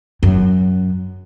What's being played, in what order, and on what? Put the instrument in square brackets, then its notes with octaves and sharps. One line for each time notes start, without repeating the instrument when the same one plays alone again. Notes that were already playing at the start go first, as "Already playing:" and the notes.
[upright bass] F#2